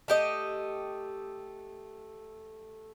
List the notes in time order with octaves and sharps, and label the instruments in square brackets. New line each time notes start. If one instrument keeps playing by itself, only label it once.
[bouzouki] A3 G4 D#5